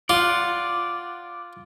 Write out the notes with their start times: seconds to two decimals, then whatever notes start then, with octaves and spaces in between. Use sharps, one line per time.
0.09 F4 D5 F#5